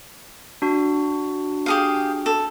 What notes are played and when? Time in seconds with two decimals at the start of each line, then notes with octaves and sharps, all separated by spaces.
0.62 D4 F#4
1.66 G4 G#4 F5
2.26 A4